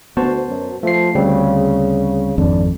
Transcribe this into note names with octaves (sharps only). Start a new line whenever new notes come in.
D2 B3 F#4 C5 A5
F#2
F3 A3 C7
D2 C#3 G3 C4
G#1 F2 D4